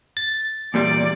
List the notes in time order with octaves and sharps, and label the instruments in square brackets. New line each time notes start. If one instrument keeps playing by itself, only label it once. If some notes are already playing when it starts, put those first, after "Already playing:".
[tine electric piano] A6
[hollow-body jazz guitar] E2 A#2 G3 [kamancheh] D5